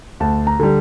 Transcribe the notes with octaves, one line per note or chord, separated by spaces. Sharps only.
D2 A5
A#5
D3 G3